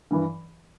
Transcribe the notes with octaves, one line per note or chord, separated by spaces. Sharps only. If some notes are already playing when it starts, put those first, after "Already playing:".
G2 E3